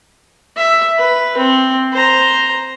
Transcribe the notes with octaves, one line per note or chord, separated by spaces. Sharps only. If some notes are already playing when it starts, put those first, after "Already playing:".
E5
B4
C4
C5 A#5